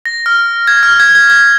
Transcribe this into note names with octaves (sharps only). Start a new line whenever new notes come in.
A#6
F6
G#6
F6
G#6
G#6
G#6